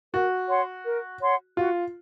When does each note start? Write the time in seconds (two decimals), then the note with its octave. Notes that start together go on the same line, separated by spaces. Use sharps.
0.13 F#4 A#4
0.49 C#5 F#5 C6
0.86 A#4
1.21 C#5 F#5 C6
1.57 F4 F#4